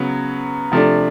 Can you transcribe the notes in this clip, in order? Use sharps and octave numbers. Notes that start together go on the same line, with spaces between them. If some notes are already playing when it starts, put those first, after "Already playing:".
Already playing: C#3 F#3 B3
C3 F3 A3 D4